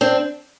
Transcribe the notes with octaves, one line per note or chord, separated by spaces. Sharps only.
C4 D4